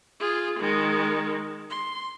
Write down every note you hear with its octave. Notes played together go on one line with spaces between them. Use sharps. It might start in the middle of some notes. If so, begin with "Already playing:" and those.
F4 G#4
D#3 G#3
C6